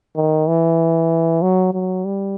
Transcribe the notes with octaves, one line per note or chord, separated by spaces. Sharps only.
D#3
E3
F#3
F#3
G3